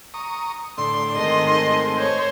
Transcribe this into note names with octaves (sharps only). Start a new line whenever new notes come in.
A#5 C#6 D#6
A2 D3 C6
G#2 D#3 A3 C4 D#5
C5 C#5